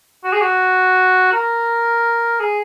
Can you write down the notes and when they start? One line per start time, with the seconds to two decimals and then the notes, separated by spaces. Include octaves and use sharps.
0.24 F#4
0.33 G#4
0.42 F#4
1.32 A#4
2.40 G#4